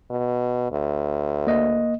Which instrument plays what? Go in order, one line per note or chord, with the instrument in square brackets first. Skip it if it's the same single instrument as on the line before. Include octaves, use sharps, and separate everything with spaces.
[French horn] B2
D2
[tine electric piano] A#3 D#5